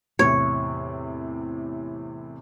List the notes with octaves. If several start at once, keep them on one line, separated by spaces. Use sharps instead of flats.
E2 A2 C3 C#5